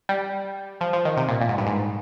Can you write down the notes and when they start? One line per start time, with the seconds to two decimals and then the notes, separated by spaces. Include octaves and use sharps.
0.09 G3
0.81 F3
0.93 F3
1.05 D#3
1.17 C3
1.28 A#2
1.41 A#2
1.49 G#2
1.58 G2
1.67 G#2